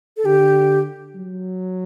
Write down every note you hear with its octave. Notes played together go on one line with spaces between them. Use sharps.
A4
D3 G4
F#3